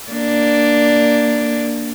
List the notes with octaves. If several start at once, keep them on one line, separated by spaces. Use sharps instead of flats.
A#3 D4